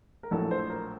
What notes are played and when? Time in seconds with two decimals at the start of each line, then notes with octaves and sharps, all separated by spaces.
0.23 A#4
0.31 A#1 A2 F#3 A4
0.51 C5
0.70 A#4